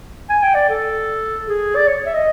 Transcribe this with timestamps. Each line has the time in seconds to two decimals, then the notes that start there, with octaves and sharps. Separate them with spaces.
0.30 G#5
0.43 G5
0.55 D5
0.69 A4
1.48 G#4
1.76 D5
1.88 C#5
2.06 E5
2.14 D#5